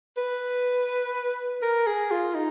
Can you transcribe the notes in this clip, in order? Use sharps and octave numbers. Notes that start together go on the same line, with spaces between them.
B4
A#4
G#4
F4
D#4